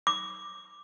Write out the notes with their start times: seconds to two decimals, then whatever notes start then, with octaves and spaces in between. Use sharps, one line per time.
0.07 D6